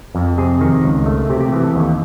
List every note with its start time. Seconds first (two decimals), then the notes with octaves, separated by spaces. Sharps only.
0.15 F2
0.38 C3 G#4
0.61 D#3
0.84 C#2
1.06 A3
1.30 C3 G4
1.40 G4
1.53 E3 G#4
1.64 A4
1.75 D#2